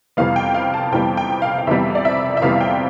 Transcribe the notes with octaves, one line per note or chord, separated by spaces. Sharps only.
F2 C3 E3 G3 B3 F5
G5
F5
A5
F2 C3 E3 G3 B3 G5
G5
F5
F5
F2 C3 E3 G3 B3 E5
D5
E5
E5
F2 C3 E3 G3 B3 F5
F5
G5